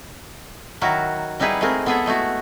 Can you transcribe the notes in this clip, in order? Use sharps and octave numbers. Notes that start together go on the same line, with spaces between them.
D#3 F#3 E4 F#4 A#4
G3 D#4 E4 G#4 B4 F#5
G#3 A3 C4 G#4 A#4
B3 E4 G#4 A4 E5 F#5
G#3 A3 E4 F#4